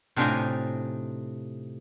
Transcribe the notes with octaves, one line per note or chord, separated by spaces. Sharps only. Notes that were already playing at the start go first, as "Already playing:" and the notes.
A2 C3 D4 D#4 F4 G#5